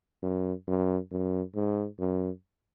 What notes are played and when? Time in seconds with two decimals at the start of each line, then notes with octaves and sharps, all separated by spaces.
0.22 F#2
0.67 F#2
1.11 F#2
1.55 G#2
1.99 F#2